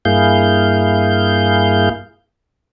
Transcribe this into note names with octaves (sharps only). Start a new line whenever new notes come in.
G2 A#3 E4 G#4 F5 G6